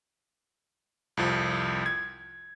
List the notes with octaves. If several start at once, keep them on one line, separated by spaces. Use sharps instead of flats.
C2 F2 F3
G#6